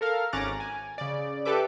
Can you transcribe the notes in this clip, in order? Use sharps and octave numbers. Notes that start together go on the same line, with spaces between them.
A4 A#4 F5
G#1 C#4 A#5 D6 F#6 A6
G#5
C#3 D5
G4 A4 B4 E5 D6